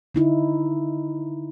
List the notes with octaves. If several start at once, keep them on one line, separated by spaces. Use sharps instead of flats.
D3 D#4 E4